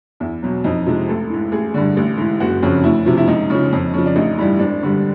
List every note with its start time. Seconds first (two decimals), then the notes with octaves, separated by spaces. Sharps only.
0.20 E2 E4
0.42 B2 F#3
0.64 F2 D#4
0.86 C3 F3 G#3
1.08 A1 A4
1.30 G#2 E3
1.52 A1 G#4
1.74 G2 D3
1.97 A1
2.18 G#2 E3
2.40 F#1 F#4
2.63 F2 C#3
2.84 D2 E4
3.06 C3 F3
3.18 E4
3.27 C#2 D#4
3.50 C#3 F3
3.73 F2
3.94 C#3 F3
4.06 D4
4.16 A1 D#4
4.38 G2 E3 G3
4.59 G#1 D4
4.82 G2 D3 G3